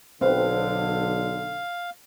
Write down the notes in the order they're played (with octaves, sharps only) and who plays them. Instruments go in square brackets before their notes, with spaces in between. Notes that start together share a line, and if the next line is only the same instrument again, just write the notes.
[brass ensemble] B1 D3 [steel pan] C4 B4 [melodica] F5